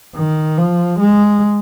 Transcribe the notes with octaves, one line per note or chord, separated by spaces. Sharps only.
D#3
F3
G#3